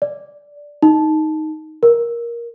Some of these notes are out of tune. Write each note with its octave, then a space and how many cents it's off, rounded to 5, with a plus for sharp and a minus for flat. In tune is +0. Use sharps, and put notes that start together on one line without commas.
D5 -10
D#4 +5
A#4 +10